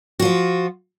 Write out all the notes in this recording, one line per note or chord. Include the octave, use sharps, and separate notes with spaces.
F3 F4 F#4